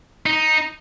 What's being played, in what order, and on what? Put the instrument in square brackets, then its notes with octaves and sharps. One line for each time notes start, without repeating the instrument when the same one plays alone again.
[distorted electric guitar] D#4